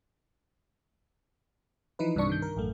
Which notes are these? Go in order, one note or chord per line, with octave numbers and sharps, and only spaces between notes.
E3 F3 D#4 B4
C2 G2 C3 D4 C#6
G2 D#3 G6
A#4
A1 F#2 A3